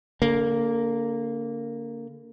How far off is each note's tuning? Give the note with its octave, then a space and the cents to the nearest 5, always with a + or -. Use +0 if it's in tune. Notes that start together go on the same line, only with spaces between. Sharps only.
D3 -40 A#3 -10